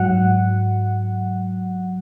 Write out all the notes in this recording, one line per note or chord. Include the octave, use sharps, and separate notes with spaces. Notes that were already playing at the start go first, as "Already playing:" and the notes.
Already playing: G#2 F#3 F#5